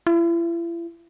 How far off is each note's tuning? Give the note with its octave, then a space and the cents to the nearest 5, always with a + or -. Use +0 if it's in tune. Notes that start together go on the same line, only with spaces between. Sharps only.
E4 +40